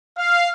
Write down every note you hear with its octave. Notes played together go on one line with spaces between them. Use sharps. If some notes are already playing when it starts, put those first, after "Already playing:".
F5